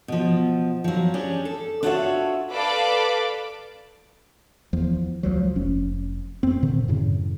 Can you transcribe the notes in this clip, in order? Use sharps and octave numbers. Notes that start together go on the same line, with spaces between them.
B2 F3
F3 F#3
C#4 D4 G4 G#4
A4
D4 F4 F#4 A4 C#5 E5
A4 B4 D5 F5 D6
E2 F3
C#2 F3 F#3
F1 C#4
F2 C4
A#2 D3 D#3
F#2 A2 C#3